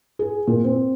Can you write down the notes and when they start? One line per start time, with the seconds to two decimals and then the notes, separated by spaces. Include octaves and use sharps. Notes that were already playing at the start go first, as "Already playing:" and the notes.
0.19 G#4
0.47 A#2
0.64 C4